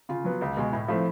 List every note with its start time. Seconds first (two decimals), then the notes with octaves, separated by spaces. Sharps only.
0.09 C#3 F4
0.24 F#3 B3
0.41 C#2
0.57 B2 G#3
0.73 A2 E4
0.88 F3 A3 C4